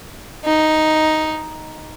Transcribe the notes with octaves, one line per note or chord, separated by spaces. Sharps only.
D#4